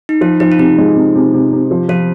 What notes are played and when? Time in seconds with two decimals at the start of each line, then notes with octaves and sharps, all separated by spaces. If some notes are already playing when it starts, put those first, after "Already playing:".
0.09 D#4
0.21 F3 F4
0.40 F3 D#4
0.52 F4
0.59 C3 D#4
0.78 G#3
0.95 C3
1.15 C3
1.34 C3
1.52 C3
1.71 F3
1.89 F3 F4